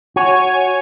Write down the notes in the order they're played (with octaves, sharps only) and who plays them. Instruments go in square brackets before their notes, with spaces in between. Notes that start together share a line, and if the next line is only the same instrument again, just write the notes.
[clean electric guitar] F#4 [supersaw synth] C#5 G#5